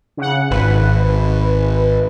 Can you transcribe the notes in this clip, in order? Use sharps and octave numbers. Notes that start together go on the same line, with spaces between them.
C#3 F#5
G#1 B4